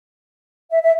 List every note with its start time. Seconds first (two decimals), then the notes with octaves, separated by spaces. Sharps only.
0.71 E5
0.83 E5